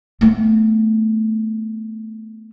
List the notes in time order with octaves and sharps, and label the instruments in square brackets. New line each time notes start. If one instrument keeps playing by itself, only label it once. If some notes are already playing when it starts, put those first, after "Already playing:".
[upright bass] A3 B3